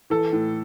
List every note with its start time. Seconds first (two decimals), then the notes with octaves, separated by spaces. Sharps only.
0.10 E3 A4
0.33 A2